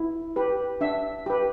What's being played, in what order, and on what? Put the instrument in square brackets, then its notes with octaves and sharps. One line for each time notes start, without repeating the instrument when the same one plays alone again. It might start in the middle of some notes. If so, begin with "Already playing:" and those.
Already playing: [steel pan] E4
G4 B4
D4 E5
G4 B4